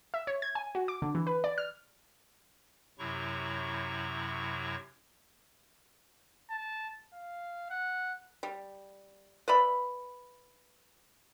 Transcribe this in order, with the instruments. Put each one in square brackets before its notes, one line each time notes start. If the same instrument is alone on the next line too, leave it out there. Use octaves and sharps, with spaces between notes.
[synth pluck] E5
C#5
G#6
G#5
F#4
D6
D3
E3
B4
D5
F6
[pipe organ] F#2 C3 F#3 E4 A#5 C#6
[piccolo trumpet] A5
F5
F#5
[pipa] G3
B4 D5 E5 B5